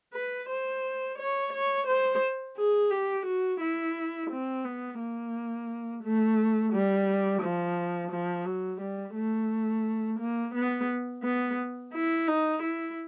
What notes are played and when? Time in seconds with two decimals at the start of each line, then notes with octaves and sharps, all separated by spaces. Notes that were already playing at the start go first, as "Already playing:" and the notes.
0.14 B4
0.49 C5
1.18 C#5
1.53 C#5
1.87 C5
2.57 G#4
2.91 G4
3.26 F#4
3.61 E4
4.30 C4
4.65 B3
5.00 A#3
6.03 A3
6.73 G3
7.42 F3
8.11 F3
8.46 F#3
8.81 G3
9.16 A3
10.19 A#3
10.54 B3
11.23 B3
11.93 E4
12.27 D#4
12.62 E4